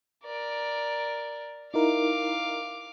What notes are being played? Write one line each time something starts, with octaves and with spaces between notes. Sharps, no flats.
A#4 D5
D#4 E4 A#4 F5 D6